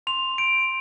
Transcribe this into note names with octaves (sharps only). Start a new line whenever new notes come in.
C6 F7
G6 D7